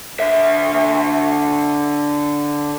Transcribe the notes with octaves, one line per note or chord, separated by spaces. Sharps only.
D3 E5